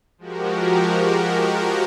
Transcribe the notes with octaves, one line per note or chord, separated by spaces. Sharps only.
F3 G#3 F#4 G4 A#4